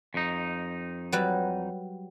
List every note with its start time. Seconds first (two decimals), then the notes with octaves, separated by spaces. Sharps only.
0.14 F2 D#4
1.12 F#3 G3 B4